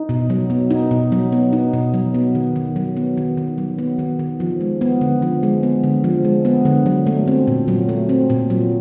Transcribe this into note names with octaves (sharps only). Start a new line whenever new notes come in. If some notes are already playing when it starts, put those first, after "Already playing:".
Already playing: D#4
B2
F#3
B3
D#4
B2
F#3
B3
D#4
B2
F#3
B3
D#3
D#3
F#3
B3
D#3
D#3
F#3
B3
D#3
D#3
F3
G#3
B3
D3
F3
G#3
B3
D3
F3
G#3
B3
D3
F#3
A3
C4
A#2
F#3
A3
C4
A#2
F#3